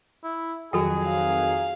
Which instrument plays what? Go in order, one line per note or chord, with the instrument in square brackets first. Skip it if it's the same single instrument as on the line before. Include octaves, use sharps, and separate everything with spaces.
[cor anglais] E4
[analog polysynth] F2 D#3 F#3 [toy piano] F#4 A4 G5 [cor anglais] G#4
[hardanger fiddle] F5